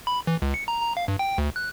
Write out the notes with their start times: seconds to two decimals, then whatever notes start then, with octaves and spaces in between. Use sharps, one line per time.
0.07 B5
0.27 E3
0.42 C#2
0.54 C#7
0.68 A#5
0.82 A#5
0.97 F5
1.08 G2
1.19 G5
1.38 D2
1.56 F#6